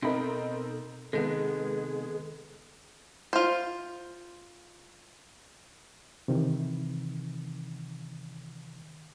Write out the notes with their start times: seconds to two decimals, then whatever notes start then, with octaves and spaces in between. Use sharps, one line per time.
0.02 B2 C4 D#4 A4 A#4 B5
1.13 C3 D#3 G#3 B3 G#4 A4
3.33 F4 C5
6.28 C3 D#3 E3